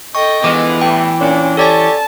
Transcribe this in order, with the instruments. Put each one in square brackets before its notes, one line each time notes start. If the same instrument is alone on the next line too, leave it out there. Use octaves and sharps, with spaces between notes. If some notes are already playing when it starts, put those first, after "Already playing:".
[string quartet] A4 D#5 G5 [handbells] C#6
[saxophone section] D3 F3 G#3 [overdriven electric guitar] E3 [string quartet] B3 [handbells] D6
[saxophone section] A2 G3 A3 [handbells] G5
[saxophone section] A#2 D4 [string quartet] C#4
[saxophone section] G4 C#5 [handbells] A4 D5 G#5 [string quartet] A5